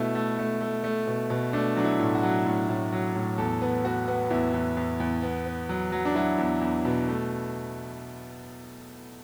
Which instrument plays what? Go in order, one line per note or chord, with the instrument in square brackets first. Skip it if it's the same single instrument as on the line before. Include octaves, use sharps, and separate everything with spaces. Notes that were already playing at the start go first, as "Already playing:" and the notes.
Already playing: [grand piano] B2 A3 E4
A3
A3
A3
A3
B2
B2
A3 D4
F#3 D4
E4
A2
F#4
F#3
A2
A2
F#3
A2
E2 A4
B3
B3 F#4
B3
E2 E4
E2
E2
E2
B3
B3
F#3
F#3
D4
F#3 E4
E2
E2
B2
A3